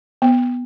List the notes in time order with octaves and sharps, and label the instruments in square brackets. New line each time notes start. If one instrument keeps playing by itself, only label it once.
[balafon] B3